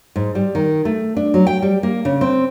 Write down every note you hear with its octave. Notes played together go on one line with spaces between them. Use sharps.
G#2
G3
D#3
A3
D4
F#3
G5
G3
A#3
C#3
C4